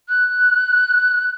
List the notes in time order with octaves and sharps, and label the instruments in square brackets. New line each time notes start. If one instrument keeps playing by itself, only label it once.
[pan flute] F#6